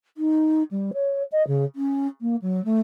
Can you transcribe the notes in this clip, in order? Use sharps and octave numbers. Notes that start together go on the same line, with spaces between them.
D#4
G3
C#5
D#5
C#3
C#4
A#3
F#3
A3